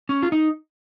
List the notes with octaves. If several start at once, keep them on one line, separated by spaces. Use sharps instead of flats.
C#4
F4
D#4